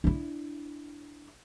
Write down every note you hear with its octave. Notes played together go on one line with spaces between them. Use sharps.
D4 E4